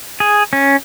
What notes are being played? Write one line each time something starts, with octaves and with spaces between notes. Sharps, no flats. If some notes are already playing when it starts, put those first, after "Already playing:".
G#4
C#4